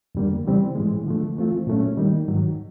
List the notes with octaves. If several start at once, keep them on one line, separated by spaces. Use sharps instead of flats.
F2 D3 G3 A#3
C#3 E3 G3 C4
A2 E3 G#3
D3 F3 A3
E3 A3 C4 F4
A#2 F#3 A3 C#4
D#3 G3 A#3 D#4
G#2 D#3 F#3